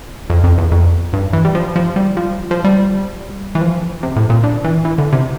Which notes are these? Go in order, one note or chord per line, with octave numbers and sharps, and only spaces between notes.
F2
F2
E2
F2
G2
E3
G3
F3
F3
G3
F3
F3
G3
E3
F3
C3
A2
A#2
D3
E3
E3
D3
C3